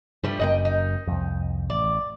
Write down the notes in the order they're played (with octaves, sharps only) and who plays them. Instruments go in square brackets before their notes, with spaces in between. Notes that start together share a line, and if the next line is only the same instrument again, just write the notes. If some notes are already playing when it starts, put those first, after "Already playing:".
[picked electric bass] G2 [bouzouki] F3 G3 A3
[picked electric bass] F#1 F#2 A#3 [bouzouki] D#5 F#5 G5
[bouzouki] D#4
[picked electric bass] C2 F2
[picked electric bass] A1 [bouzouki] D5